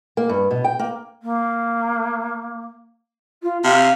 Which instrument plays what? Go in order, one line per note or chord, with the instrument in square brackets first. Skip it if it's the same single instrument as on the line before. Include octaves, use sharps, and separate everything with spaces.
[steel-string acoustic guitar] A#3
G2
B2
G5
A#3
[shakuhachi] A#3
F4
[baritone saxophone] C3 [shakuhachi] F5